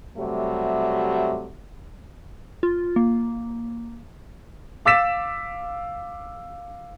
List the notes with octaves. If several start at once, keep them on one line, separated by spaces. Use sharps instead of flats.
C3 F#3 G3 A3 F#4
F4
A#3
F5 D6 E6 A6 B6 E7